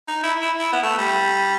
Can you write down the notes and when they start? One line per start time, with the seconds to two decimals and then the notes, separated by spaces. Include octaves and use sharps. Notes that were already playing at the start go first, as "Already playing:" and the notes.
0.08 D#4
0.23 E4
0.42 E4
0.59 E4
0.73 B3
0.83 A3
0.99 G3